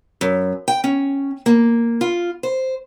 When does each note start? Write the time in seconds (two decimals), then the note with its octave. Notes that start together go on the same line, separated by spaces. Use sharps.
0.21 F#2
0.68 G5
0.84 C#4
1.46 A#3
2.01 F4
2.43 C5